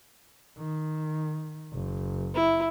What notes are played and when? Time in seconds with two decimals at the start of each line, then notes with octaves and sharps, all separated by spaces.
0.58 D#3
1.73 F#1
2.35 E4